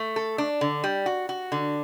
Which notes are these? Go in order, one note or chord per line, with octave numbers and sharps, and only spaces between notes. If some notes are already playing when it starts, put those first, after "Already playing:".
Already playing: A3
A4
D4
D3
G3
F#4
F#4
D3